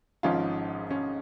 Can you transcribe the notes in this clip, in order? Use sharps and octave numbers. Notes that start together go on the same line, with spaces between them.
G#1 G#2 F3 C#4 F4
C#4